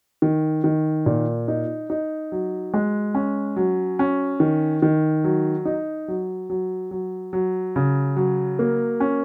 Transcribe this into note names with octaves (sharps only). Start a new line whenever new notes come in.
D#3
D#3
A#2
D#4
D#4
F#3
G#3
C#4
F#3
C#4
D#3
D#3
F#3
D#4
F#3
F#3
F#3
F#3
C#3
F#3
A#3
C#4